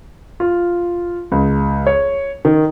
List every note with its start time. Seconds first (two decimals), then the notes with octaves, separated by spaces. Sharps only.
0.40 F4
1.32 C#2
1.87 C#5
2.45 D#3